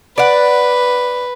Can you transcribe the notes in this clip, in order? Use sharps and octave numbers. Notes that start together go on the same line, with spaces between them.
B4 D5 F#5